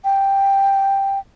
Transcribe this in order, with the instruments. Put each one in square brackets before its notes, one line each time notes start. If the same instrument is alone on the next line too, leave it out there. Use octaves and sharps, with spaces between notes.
[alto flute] G5